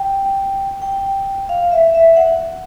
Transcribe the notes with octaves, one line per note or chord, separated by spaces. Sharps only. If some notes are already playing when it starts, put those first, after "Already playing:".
Already playing: G5
G5
F5
E5
E5
F#5